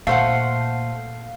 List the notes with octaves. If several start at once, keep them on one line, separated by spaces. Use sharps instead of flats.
A#2 A3 C5 F5 F#5